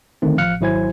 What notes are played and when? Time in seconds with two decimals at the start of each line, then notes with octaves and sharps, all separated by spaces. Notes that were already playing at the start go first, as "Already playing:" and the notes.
0.22 D3 D#3 A3 C4
0.38 A1 F3 F5 F6 F#6 C#7
0.61 G#1 F#3 E4 C5 G#5 G#6